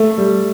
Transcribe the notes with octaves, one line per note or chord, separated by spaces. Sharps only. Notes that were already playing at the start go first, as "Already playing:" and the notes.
Already playing: A3
G3